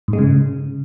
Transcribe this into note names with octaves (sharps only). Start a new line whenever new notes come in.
G#2
G#3
C#3